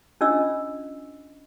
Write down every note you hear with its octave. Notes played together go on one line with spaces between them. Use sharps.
C#4 D4 F4 D#5 E6